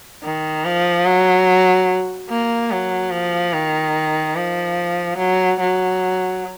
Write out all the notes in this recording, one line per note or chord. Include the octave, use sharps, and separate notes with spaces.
D#3
F3
F#3
A#3
F#3
F3
D#3
F3
F#3
F#3